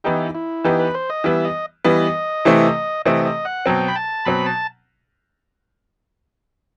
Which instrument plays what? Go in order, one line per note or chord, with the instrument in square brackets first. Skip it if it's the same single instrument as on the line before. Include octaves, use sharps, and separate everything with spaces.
[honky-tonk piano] E3 B3 D#4 G4 [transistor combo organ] E4
[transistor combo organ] E4
[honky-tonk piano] E3 B3 D#4 G4
[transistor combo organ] B4
C5
D#5
[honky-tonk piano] E3 G3 B3 [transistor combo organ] E5
[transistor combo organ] D#5
[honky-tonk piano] E3 G3 B3 [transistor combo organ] D#5
[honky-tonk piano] C3 E3 A3 C4
[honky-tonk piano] C3 E3 A3 C4 [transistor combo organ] D#5
[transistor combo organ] D#5
F#5
[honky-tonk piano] B2 F#3 C4 [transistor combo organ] G5
[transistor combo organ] B5
A5
[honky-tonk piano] B2 F#3 C4 [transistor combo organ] B5
[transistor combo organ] A5